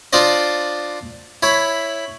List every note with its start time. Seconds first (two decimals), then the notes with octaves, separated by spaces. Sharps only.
0.13 D4 F4 C5 D5 D#5
1.43 E4 C#5 B5